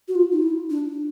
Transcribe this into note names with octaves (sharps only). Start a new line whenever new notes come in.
F#4
F4
D#4
E4
D4